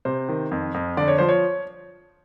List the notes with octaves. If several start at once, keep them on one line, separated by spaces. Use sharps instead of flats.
C3 C5
D#3
F2
F2
D3 D5
C#5
F3 C5
C#5